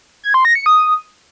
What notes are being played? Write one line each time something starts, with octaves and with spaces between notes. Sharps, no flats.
G#6
C6
A#6
C#7
D#6